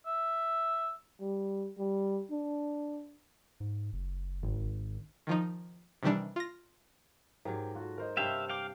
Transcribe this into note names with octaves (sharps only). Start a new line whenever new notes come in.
E5
G3
G3
D4
G#2
F#1
G#1
D#3 F3 D#4
C3 D#3 E3 G3 D4
F4 A#6
G#2 F#3 G4 A#4
F4 F#4 A4
A#4 C5 D#5
G2 C3 C#5 E5 F5 G5
F5 G5 D6